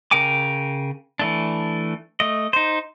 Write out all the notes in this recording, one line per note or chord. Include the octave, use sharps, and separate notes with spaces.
C#3 A#4 G5 G#5 D6
E3 A3 D4
A3 D#5
D#4 C5